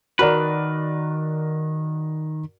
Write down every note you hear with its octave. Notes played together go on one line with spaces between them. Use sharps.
D#3 F#4 A#4 B4 D5